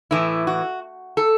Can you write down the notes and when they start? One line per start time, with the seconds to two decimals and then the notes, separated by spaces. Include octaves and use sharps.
0.11 A2 E3 E4
0.47 F#4
1.17 A4